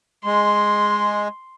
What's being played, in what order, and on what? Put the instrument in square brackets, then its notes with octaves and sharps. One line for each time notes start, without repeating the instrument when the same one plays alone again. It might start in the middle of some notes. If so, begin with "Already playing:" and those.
[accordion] G#3 [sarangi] C6